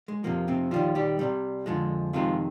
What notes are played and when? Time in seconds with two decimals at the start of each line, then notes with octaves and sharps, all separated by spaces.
0.08 G#3
0.24 F2 C3 F3 A#3
0.48 C3 C4
0.71 D#2 D#3 F3 G3 F4
0.95 G3 G4
1.19 C2 C3 G3
1.66 F2 D3 F3 G#3
2.13 F2 C3 D#3 F3 G#3 F4